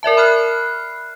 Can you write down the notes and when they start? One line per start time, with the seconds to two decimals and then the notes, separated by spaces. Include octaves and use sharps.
0.03 A#4 D5 E5 A5
0.17 B5 F6 F#6 C7